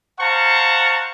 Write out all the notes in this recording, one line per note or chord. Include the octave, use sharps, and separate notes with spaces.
C5 F5 F#5 A5 A#5 C#6